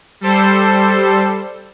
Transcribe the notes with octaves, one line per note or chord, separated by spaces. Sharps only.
G3 A4 C5